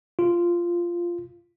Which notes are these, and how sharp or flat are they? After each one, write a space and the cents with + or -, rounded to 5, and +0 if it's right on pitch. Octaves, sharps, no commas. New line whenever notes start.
F4 -10